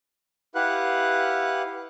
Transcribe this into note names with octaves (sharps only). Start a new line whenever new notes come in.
E4 G4 B4 F5 F#5 F#6